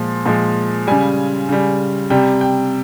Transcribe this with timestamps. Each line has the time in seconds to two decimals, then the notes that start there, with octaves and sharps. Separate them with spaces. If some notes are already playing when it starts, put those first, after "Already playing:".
Already playing: A#2 F3 G#3
0.26 A#2 F3 G#3
0.87 C#3 G3 G#5
1.49 C#3 G3
2.10 C3 G3 G5
2.41 G5